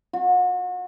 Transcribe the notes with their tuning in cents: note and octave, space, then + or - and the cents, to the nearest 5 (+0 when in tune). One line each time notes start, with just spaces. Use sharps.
F#4 -35